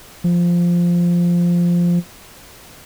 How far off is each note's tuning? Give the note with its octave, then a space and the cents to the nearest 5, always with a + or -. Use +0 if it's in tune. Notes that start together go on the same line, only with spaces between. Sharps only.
F3 -5